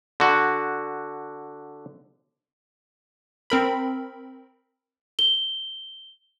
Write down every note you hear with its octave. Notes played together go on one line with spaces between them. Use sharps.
D3 F#4
C4 A#4 B5
G7